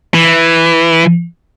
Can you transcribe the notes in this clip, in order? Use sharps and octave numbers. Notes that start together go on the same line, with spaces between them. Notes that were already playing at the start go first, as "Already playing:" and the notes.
E3